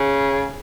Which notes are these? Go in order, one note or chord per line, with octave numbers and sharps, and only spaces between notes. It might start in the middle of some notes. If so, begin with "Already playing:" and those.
Already playing: C#3